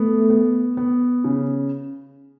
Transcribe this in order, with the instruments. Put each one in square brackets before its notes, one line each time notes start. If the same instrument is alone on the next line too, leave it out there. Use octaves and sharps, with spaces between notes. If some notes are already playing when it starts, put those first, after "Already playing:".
Already playing: [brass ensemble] A3 [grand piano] B3
[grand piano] B3
B3
C#3